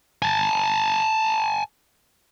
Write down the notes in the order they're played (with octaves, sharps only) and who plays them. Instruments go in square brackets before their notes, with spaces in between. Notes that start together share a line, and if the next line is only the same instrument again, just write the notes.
[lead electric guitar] G#5 A5